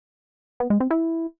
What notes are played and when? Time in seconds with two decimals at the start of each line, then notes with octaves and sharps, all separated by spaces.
0.60 B3
0.70 G#3
0.80 C4
0.90 E4